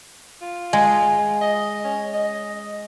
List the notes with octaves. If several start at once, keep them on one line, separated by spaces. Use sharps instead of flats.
F4
G#3
D#5
C#4
D#5